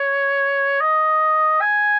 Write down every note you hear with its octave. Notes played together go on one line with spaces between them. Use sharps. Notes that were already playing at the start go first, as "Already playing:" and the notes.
Already playing: C#5
D#5
G#5